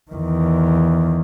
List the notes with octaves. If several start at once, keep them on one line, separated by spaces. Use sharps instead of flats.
E2 D#3